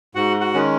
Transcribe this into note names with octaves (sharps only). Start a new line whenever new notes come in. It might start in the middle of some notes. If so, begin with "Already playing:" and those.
G#2 F#4 F#5
F#4 F#5
D#3 G#3 C#4